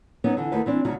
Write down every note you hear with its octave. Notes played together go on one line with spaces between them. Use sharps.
F#3 B3 C#4 D#4
D3 E3
D#2 A3 F#4 B4
E3 C4 D4
D2 C#3 F#3 D#4 F#4